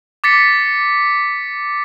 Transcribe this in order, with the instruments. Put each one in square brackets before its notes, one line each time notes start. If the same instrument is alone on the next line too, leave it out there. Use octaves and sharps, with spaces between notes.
[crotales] D6 A6 B6 C#7